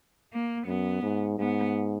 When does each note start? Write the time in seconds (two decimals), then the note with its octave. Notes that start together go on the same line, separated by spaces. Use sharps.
0.31 A#3
0.66 F#2 B3
1.03 G#2
1.39 G#2 B3